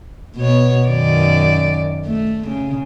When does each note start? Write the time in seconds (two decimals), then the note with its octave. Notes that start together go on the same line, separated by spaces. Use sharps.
0.36 B2 B3 C#5
0.88 F#2 D#3 D5
2.06 A3
2.48 C#3